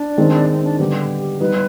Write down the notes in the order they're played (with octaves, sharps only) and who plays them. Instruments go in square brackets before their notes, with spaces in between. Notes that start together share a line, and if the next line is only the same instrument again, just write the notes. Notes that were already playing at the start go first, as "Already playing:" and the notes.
Already playing: [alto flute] D4
[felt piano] D#3 G#3 C4 D#4
[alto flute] C4
D4
[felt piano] D3 G3 B3 D#4 [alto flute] G4
[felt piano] G3 B3 D#4 [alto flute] B4